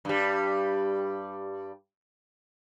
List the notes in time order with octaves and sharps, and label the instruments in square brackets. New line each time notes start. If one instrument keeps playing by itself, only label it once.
[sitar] G2 G3